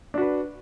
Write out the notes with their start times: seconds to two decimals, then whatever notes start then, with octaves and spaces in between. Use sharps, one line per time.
0.14 D4
0.18 F#4
0.21 B4